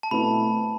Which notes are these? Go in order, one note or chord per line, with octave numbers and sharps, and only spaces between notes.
A5
B2 A3 C4 E4 B4 B5